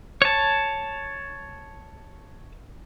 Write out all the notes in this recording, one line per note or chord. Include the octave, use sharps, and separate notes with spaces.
C#5 A5